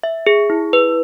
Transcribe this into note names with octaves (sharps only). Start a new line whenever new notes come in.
E5
G#4
E4
B4